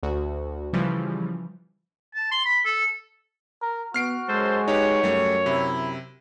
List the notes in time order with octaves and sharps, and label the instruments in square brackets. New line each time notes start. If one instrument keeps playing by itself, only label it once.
[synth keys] D2 F#4
C#3 E3 F3 G3
[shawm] A5
C6
B5
A4
[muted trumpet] A#4
[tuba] B3 [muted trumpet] F#4 [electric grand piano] F6 C7 D7
[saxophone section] F#2 A4 C5 [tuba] G#3
[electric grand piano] D#4 G4 B4 [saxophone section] C#5
[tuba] F#2 [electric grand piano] G3 A3
[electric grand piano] C3 [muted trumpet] E4